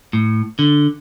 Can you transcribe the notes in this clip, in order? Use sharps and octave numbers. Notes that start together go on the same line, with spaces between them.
A2
D3